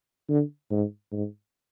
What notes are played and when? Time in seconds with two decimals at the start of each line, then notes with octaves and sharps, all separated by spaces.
0.29 D3
0.71 G#2
1.12 G#2